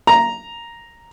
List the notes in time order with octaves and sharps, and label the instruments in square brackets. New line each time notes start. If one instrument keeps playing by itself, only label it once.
[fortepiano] A#5